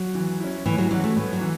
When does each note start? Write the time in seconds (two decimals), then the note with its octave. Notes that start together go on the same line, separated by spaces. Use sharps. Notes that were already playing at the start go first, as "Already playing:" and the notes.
Already playing: F#3
0.15 E3
0.40 C#4 E4
0.65 A2 E3
0.78 F#3
0.91 E3 F#3 C#4 F#4
1.04 A3
1.16 A2 B3
1.33 F#3
1.41 E3